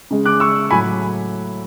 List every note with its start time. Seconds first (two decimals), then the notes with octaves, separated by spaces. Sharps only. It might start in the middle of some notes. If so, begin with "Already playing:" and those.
0.11 C#3 G#3
0.26 D6 F#6
0.40 C#6 E6
0.71 A2 F#3 G#5 B5